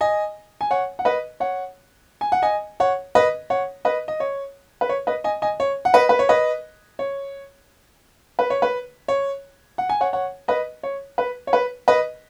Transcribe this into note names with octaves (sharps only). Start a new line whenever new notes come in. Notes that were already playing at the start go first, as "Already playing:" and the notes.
D#5 G#5
G#5
C#5 F#5
F#5
B4 D#5
C#5 F#5
G#5
F#5
D#5 G#5
C#5 F#5
B4 D#5
C#5 F#5
B4 D#5
D#5
C#5
B4
C#5
B4 D#5
D#5 G#5
D#5 G#5
C#5
F#5
B4 D#5
B4
C#5
B4 D#5
C#5
B4
C#5
B4
C#5
F#5
G#5
C#5 F#5
C#5 F#5
B4 D#5
C#5
B4
C#5
B4
B4 D#5